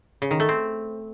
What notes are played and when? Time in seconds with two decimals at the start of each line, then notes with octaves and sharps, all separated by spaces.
0.22 C#3
0.31 D#3
0.40 A3
0.49 C4